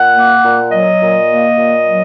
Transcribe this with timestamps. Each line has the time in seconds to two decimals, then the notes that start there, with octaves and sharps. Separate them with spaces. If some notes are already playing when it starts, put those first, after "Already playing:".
Already playing: A#2 F#5
0.16 A#3
0.44 A#2
0.71 F#3 D#5
1.01 A#2
1.29 A#3
1.56 A#2
1.85 F#3